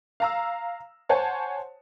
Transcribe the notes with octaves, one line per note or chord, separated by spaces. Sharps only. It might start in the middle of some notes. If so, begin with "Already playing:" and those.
F5 A#5 E6
C5 C#5 F#5 G#5 A5